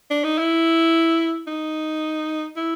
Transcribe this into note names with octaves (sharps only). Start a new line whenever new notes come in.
D4
D#4
E4
D#4
E4